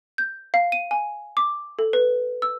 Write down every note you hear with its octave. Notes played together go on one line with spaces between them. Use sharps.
G6
F5
D#7
G#5
D6
A4
B4
E6